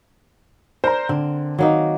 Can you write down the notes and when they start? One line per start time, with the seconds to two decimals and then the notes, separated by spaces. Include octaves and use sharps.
0.84 A#4 C5 D5 A#5
1.09 D3 C4
1.58 D#3 F#3 A#3 D#4